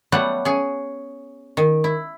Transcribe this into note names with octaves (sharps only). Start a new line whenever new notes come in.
F#3 G3 A3 B3 F#5
C#4 G#4
D#3
E4